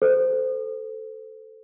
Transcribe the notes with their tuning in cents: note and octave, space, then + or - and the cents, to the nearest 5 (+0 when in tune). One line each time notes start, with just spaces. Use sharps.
A4 +0 C5 -20